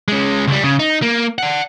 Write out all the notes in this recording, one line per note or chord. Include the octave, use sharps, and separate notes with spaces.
G#3 C#4
C#2 G3
C#3
D#4
A#3
D5 F#5